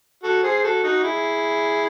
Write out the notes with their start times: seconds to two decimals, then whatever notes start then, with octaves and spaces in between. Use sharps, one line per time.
0.23 F#4 A4
0.44 G#4 C5
0.64 F#4 A4
0.84 D#4 F#4
1.04 E4 G#4